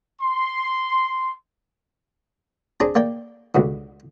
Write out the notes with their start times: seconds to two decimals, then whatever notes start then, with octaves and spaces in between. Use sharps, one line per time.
0.22 C6
2.80 C4 D4 G#4 D5 A#5
2.95 A#3 D5 G5
3.55 C#2 B2 D3